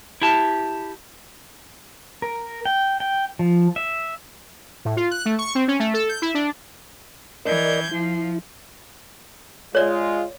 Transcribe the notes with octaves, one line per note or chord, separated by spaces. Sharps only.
E4 G4 A5
A#4
G5
G5
F3
E5
A2
F4
F#6
A3
C#6
C4
C#4
A3
A4
G6
E4
D4
E3 A#4 D5 D#5 G6 G#6
F3 E4
G#3 F4 C#5 D5